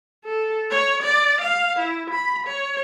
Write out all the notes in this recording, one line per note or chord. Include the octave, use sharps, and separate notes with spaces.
A4
C#5
D5
F5
E4
B5
C#5